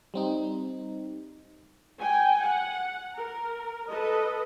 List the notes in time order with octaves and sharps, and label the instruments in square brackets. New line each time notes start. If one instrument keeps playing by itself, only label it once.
[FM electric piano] G3 C4 D#4
[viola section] G5 G#5
F#5
A#4
A4 B4 D#5